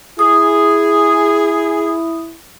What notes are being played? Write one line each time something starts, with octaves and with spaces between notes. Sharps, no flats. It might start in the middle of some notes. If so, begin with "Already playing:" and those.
E4 G#4 D#6